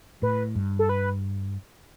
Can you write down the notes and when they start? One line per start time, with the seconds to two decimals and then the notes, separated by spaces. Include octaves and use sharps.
0.22 A2 B4
0.56 G2
0.79 A4
0.89 B4